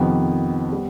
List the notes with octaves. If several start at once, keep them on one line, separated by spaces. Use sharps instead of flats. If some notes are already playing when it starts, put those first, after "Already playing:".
Already playing: F2 C3 D#3 B3
G3 B3